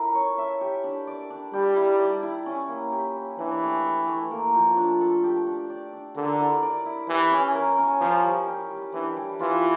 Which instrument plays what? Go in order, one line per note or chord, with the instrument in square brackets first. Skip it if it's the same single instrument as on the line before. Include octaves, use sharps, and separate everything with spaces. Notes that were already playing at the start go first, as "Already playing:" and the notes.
Already playing: [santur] C#4 E4 A4 A#4
C#5
E5
G4
D4
D5
D4
[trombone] G3 [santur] G4
[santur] E4
D5
E4
C#4
A#3
G4
C#5
[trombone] E3 [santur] D4
[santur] A3
A4
A3
A#3
F3
D4
A4
G4
D4
D5
D4
[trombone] D3 [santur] A#4
[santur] E4
D5
E4
[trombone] E3 [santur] G4
[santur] C#4
A#4
C#4
[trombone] F3 [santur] C#4
[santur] G3
G4
G3
[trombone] E3 [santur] D4
[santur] G3
[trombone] E3 [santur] F4